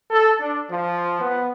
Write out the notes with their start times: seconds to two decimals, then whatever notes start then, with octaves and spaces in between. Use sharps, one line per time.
0.10 A4
0.40 D4
0.70 F3
1.20 B3